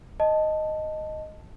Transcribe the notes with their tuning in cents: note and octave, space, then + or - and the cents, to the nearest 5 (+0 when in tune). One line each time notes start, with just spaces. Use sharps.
D#5 +0 A5 +0